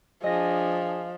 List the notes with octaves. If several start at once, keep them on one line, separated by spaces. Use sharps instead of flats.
F3 D4 G#4 D#5 A#6